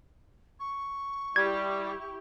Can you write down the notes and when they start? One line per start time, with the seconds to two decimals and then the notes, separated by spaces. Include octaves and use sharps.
0.59 C#6
1.36 G3 E4 G4 G#6